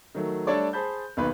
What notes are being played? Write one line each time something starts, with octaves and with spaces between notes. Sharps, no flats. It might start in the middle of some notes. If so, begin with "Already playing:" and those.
D#3 F#3 A3
G3 A3 D4 A4 C#5 D5
G#4 C5 A5 B5 G6
B1 D#3 A#3 B4